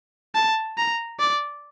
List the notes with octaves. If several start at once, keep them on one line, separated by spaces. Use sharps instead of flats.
A5
A#5
D5